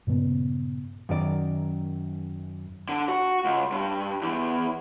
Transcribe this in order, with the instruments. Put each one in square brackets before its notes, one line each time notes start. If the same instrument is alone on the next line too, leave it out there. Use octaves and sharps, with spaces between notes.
[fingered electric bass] G2 A#2 C#3 B3
[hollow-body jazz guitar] F#2 D#3 D5
[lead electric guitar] D3
F#4
C#2
G2
E2